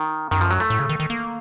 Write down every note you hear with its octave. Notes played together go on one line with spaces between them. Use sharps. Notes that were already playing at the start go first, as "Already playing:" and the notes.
Already playing: D#3
F#2 D#3
F3
F#3
A3
A2
C#3
D#3
D#3
A#3